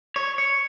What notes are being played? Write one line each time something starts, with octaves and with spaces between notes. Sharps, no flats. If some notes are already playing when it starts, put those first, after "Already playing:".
C#5
C#5